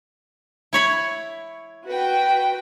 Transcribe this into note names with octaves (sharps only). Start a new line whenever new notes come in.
E4 C#5 B5
F#4 B4 G5